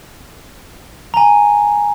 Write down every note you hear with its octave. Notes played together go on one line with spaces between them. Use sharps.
G#5 A#5